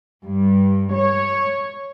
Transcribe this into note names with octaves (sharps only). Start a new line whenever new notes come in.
G2
C#5